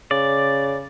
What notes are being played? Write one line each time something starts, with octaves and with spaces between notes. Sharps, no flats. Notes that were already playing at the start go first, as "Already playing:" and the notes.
C#3 D5